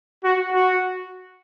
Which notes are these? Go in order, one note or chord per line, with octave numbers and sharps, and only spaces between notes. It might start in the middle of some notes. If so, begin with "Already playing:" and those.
F#4
F#4